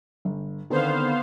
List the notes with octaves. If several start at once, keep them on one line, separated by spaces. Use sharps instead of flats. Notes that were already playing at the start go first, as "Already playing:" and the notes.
G1
D3 D#3 B3 C4 C5 F5